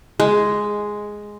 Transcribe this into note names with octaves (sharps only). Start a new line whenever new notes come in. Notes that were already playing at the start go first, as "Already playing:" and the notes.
G#3